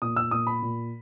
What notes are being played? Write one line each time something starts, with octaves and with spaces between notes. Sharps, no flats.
A#2 D#6
E6
A#2 D#6
B5
A#2